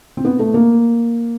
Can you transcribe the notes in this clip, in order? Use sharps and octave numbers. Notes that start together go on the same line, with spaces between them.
C4
B3
A3
A#3